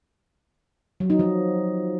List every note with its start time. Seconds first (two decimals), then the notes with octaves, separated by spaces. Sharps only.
1.00 F#3
1.10 D#4
1.19 F3